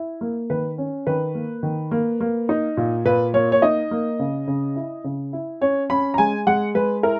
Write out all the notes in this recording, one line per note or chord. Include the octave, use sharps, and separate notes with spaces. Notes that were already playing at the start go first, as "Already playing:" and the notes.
Already playing: E4
A#3
D#3 B4
C#4
D#3 B4
A#3
D#3
A#3
A#3
D#4
A#2
A#2 B4
A#3 C#5
C#5
D#4 D#5
A#3
C#3
C#3
E4
C#3
E4
C#4 C#5
C#4 B5
A#5
G#3 G#5
G#3 F#5
G#3 B4
E4 A#4